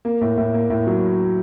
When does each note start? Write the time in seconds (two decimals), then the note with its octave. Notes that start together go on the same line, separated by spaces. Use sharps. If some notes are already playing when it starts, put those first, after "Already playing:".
0.05 A#3
0.21 A2
0.37 A2
0.54 A#3
0.70 A2
0.87 F#3